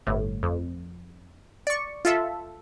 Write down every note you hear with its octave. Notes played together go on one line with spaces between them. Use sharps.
G1 A2
F2
D5 C#6
F4 A4 E5